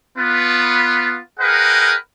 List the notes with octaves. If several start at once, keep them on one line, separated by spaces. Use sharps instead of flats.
B3 F4 B4
G#4 A#4 B4 D#5 F#5 G5